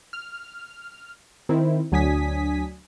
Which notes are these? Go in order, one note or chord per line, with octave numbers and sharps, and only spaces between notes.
F6
D#3 C4 E4
D2 F#3 D4 G#5 D#6 B6